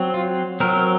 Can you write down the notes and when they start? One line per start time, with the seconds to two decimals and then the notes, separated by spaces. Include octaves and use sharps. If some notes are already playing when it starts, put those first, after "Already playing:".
Already playing: F#3 C4
0.14 F4
0.60 F#3 C4 A#4